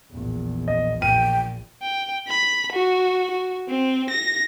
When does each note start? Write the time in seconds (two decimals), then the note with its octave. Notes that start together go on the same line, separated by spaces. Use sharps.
0.11 A#1 E2
0.68 D#5
1.02 A#1 G5 D#7
1.83 G5
2.29 B5
2.72 F#4
3.31 F#4
3.69 C4
4.10 A#6